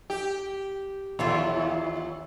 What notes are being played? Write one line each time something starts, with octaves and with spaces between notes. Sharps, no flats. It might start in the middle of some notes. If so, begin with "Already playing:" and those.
G4
D#2 E4 F4 C#5